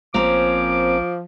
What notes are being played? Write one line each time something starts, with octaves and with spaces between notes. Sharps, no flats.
A#1 F3 A#3 C4 C#4 D6